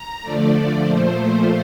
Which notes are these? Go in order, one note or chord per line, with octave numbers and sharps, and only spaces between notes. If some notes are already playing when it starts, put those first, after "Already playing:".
Already playing: A#5
D3 F3 A3 D5
A#2 F3 A3 C5